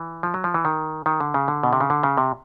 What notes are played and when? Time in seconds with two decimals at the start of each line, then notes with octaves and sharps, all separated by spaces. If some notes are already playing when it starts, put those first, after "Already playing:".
Already playing: E3
0.23 F3
0.34 F#3
0.44 F3
0.54 E3
0.65 D#3
1.06 D#3
1.20 D3
1.34 C#3
1.48 D3
1.63 B2
1.73 C3
1.81 C#3
1.90 D3
2.03 C#3
2.18 C3